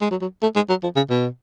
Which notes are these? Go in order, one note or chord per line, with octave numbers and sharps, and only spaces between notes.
G#3
F#3
F#3
A3
G#3
F#3
F3
C#3
B2